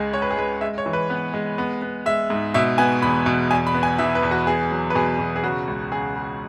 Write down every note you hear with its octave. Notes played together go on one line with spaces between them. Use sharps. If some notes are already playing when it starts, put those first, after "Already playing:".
Already playing: C#2 G#3 G#4
G#3 C#5
B4
G#4
G#3 B4
G#3 E5
C#5
E3
B4
B3
G#3
B3
B3
G#3 E5
G#2
B2 E5
B3 G#5
E2 B5
B2
E2 G#5
B5
B3
G#5
E3 E5
B4
E2
F#4
B3 G#4
F#3
B4
B2 G#4
B2
G#4
C#3 F#4
C#2
C#3 G#4
C#3